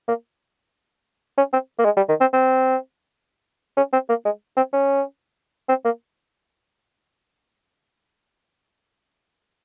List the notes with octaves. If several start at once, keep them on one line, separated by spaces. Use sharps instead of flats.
A#3
C#4
C4
A#3
G#3
G3
D#3
C4
C4
C#4
C4
A#3
G#3
C4
C#4
C4
A#3